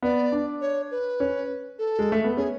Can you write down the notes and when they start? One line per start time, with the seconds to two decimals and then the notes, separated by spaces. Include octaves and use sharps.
0.02 B3 D5
0.32 D4
0.61 C#5
0.91 B4
1.20 C#4
1.79 A4
1.99 G#3
2.12 A3
2.24 B3
2.37 C#4 G#4